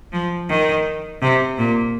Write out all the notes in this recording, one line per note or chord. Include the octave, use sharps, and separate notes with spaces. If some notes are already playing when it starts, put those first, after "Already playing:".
F3
D#3
C3
A#2